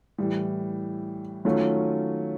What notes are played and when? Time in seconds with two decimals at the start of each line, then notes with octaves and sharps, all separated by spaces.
0.18 A2 E3 G3
1.45 D#3 F#3 A3 C#4 F4